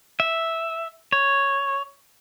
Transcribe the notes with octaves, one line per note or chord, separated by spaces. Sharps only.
E5
C#5